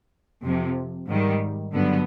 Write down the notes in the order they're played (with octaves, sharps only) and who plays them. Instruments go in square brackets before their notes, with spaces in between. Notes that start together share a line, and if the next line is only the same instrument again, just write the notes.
[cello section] F2 C3 F3
G#2 D#3 G3
G2 D3 F#3 B3